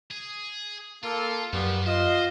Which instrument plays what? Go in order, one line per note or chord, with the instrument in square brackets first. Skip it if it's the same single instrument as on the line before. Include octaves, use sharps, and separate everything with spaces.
[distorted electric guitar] G#4
[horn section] A#3 A4 [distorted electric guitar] F4
[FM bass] F#2 [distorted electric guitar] F3 [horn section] G3 A#3 B3
[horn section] F4 D#5 [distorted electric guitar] C5